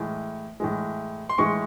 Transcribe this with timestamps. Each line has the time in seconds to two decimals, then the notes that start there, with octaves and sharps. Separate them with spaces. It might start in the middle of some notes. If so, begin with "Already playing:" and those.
Already playing: A2 E3 G#3
0.60 A2 E3 G#3
1.29 C6
1.38 A2 E3 G#3 C#6